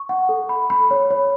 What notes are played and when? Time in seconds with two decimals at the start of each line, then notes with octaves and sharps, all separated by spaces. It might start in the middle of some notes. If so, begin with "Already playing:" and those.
Already playing: C#6
0.09 F#5
0.29 A4
0.49 B5
0.70 B5
0.91 C#5
1.11 C#5